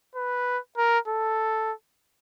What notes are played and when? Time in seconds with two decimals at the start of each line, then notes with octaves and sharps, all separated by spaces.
0.16 B4
0.77 A#4
1.08 A4